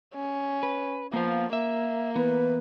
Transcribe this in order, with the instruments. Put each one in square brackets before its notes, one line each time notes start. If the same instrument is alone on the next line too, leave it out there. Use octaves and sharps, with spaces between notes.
[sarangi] C#4
[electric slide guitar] B4
[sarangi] F3 [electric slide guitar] A#3 B3 F5
[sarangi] A#3 [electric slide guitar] E5
[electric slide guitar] E3 B3 [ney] B4